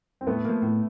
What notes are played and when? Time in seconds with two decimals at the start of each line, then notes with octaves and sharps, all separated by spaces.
0.21 C4
0.27 A2 A3 B3
0.45 F3 A#3
0.62 A2